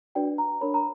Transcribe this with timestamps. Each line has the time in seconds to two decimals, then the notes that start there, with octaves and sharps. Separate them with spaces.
0.15 D4 F#4 B4 D5 G5
0.38 A#5
0.61 D4 A#4 C#5 B5
0.74 A#5